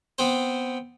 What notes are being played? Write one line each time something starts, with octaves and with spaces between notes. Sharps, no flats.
B3 C4 C5